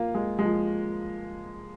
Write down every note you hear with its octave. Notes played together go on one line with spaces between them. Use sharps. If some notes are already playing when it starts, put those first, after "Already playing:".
Already playing: A#3 F4
G#3
G#3
F3